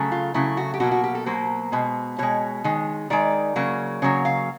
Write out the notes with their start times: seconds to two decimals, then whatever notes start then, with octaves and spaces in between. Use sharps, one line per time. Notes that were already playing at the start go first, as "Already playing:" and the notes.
Already playing: C#3 F#3 A3
0.12 F4
0.34 C#3 F#3 A3 E4
0.57 F#4
0.74 G4
0.80 B2 F#3 A#3 F#4
0.91 F#4
1.04 G4
1.15 A4
1.26 B2 F#3 A#3 C5
1.72 B2 G#3
2.18 B2 G#3 C#5
2.64 D#3 G#3
3.10 D#3 G#3 D5
3.56 C#3 F#3 A#3
4.02 C#3 F#3 A#3 C#5
4.25 F5